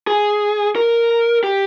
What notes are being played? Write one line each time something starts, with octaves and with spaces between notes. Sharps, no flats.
G#4
A#4
G4